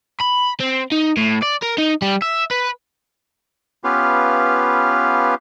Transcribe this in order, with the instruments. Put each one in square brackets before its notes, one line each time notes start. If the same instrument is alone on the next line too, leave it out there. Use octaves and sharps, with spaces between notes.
[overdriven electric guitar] B5
C4
D#4
A2
D5
A#4
D#4
G3
E5
B4
[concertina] B3 C#4 F4 G4 B4 F5